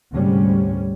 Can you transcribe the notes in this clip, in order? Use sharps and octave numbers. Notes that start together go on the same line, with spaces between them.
D2 G#2 C3 G3 C#4